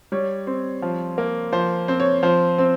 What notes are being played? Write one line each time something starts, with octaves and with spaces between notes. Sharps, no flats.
G3 C#5
C4
F3
A#3
F3 C5
C4 C5
C#5
F3 C5
C4